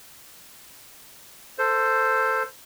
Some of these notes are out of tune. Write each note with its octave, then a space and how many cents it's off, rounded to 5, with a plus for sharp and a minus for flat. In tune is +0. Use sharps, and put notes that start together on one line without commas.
A4 +15 C5 +0